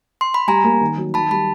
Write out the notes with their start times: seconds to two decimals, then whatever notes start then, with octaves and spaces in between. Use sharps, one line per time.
0.21 C6
0.34 B5
0.48 G3 G#5 A#5
0.64 A#3
0.81 D#3
0.97 F#3
1.14 D#3 A5 B5
1.31 G3 A5 B5